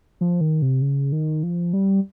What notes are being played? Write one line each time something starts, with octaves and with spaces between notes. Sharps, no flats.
F3
D#3
C3
C#3
D#3
F3
G3